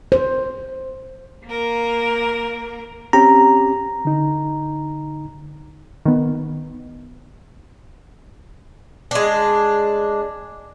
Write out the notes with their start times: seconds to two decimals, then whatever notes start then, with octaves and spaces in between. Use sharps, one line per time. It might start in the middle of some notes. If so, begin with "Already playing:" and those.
0.12 C5
1.46 A#3 A#4
3.13 C4 C#4 G4 A#5
4.05 D3 D#4
6.06 D#3 B3
9.11 G#3 D4